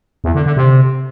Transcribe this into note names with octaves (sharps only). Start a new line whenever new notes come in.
E2
D3
D3
C3